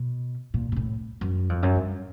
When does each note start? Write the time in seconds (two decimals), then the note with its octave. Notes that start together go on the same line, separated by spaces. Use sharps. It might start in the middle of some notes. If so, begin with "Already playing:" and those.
Already playing: B2
0.54 A#2
0.72 A#2
0.76 A2
1.21 F#2
1.49 F2
1.63 F#2
1.76 G2